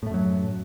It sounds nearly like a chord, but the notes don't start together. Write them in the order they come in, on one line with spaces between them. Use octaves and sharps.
A2 A3 F#2 F#3